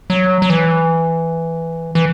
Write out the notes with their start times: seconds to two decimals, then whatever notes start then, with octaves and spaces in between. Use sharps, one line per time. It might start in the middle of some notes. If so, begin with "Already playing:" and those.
0.10 F#3
0.42 F#3
0.50 E3
1.95 E3